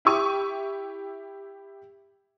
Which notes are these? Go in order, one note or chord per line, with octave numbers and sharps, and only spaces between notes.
E4 G4 C#6 D#7